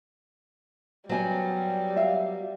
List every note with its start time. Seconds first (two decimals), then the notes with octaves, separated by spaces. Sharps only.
1.09 F#3 G3 B3 C#4 C5 G#5
1.96 E5 F5